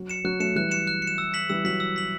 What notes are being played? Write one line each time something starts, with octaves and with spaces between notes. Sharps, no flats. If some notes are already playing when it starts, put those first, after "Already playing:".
Already playing: F#3
C#7 E7
F#3 F#6
F#3 A3 C#7 E7
E3 G3 F#6
C#7 E7
F#6
C#7
E7
E6
B6 F#7
E3 G3 E6
F#3 B6 F#7
E6
B6 F#7